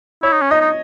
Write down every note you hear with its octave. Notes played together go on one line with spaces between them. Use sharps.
E4 C#5
D#4
C#4
D#4 D#5
D#4